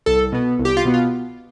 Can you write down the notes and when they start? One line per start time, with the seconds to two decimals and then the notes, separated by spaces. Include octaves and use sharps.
0.06 C2 A4
0.32 B2 B3
0.59 C2
0.65 G4
0.77 F4
0.85 B2 B3
0.94 F4